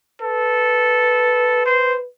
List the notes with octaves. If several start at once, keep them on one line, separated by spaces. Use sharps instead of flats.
A4 B4
C5